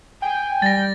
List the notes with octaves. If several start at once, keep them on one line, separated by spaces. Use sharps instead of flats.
G5 G#5
G3 A6 A#6